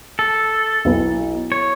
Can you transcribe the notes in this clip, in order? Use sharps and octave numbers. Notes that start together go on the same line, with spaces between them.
A4
B1 B2 B3 E4 B4
C#5